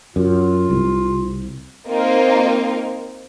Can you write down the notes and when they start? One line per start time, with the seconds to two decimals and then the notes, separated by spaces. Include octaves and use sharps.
0.16 F#2 F4
0.70 C2
1.87 A#3 C4 D#4 F4 A#4